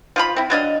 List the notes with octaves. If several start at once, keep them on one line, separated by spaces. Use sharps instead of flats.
F3 F4 B5
C4 E4
F#3 D4 D#5 F5